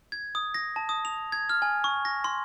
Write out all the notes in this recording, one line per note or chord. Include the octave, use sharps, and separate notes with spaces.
G#6
D#6
A#6
A5
D#6
F7
G#6
F6
G#5
C#6
A#6
C6